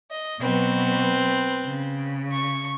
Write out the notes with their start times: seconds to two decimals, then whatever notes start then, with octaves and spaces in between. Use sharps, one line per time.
0.11 D#5
0.41 B2 F#3 C4 B4
1.66 C#3
2.32 C#6